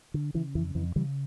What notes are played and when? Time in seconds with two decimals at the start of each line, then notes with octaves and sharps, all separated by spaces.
0.14 D3
0.34 C#3 E3
0.55 F2 E3
0.75 F2 E3
0.96 C#3 E3 G3